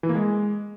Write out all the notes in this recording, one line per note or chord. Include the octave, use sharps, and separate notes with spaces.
E3
A#3
G#3